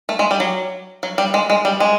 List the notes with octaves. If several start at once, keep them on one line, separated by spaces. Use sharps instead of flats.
A3
G#3
G3
F#3
F#3
G3
G#3
G#3
G3
G#3